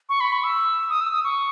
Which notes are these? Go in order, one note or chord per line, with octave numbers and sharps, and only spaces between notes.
C#6
B5
C#6
E6
D#6
E6
D#6
C#6